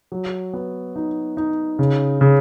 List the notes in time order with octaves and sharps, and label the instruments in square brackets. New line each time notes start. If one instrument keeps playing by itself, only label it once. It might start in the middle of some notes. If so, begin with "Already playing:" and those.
[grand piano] F#3
B3
D#4
D#4
C#3
C#3